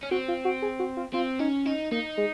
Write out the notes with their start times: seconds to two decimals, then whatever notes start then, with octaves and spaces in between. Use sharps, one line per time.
0.03 C#4
0.11 C4 F#4
0.28 F4
0.45 F#4
0.62 G#4
0.79 F#4
0.97 F4
1.14 C4 F4
1.39 C#4 D#4
1.66 C#4 D#4
1.91 A#3 D#4
2.17 G#3